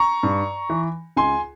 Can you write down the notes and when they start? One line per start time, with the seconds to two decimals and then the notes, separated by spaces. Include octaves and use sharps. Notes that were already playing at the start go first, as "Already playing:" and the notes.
Already playing: A#5 C#6
0.23 G2
0.70 E3
1.16 C#2 G#5 C6